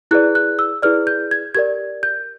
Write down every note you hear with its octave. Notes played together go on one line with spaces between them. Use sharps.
E4 G#4 B4 D5 F#6
F#6
E6
E4 G#4 B4 D5 F6
G6
G#6
G4 A#4 D5 G#6
G6